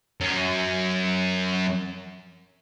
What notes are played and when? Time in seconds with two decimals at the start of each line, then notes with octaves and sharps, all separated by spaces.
0.21 F#2 C#4